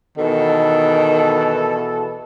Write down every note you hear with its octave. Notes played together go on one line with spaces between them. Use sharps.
E2 B2 D#3 A4